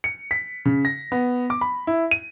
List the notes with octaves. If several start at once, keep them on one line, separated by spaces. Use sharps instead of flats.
C#7
B6
C#3
A#6
B3
D6
B5
E4
D#7